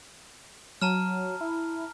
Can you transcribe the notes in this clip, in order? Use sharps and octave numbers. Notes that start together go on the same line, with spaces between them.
F#3 A5 A#5 F6
E4